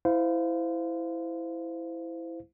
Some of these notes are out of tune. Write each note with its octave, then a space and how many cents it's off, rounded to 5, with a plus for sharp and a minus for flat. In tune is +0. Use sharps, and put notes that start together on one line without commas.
E4 +0 C5 -25 F5 +0